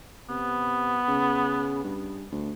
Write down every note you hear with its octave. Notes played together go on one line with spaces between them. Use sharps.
C3 B3
C#3
G2
D2